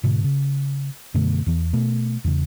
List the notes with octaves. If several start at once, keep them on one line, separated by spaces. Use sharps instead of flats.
G#2 B2 D3
C#3
F#2 B2 D3 A3
E2 E3
B2 A3
E2 C#3